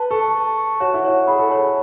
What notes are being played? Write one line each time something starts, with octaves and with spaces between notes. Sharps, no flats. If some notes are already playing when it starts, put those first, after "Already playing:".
Already playing: B4 A5
A4 C#6
A5
C#6
F#4 C#5
E4
F#4 C#5
G#4 B5
A4
A4 C#5
G#4